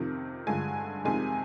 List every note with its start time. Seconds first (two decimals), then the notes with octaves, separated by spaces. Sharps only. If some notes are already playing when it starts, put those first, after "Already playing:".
Already playing: F2 C3 D#3
0.47 G2 D3 F3 G#3 G#5
1.05 F2 C3 D#3 G#3 G#5